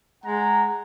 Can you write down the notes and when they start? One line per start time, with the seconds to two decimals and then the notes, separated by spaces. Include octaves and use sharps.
0.24 G#3 F#5 A#5